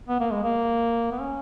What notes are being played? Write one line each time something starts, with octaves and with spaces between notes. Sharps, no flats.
B3
A#3
G#3
A#3
B3
C#4